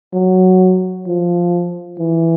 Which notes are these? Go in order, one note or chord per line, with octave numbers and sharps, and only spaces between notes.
F#3
F3
E3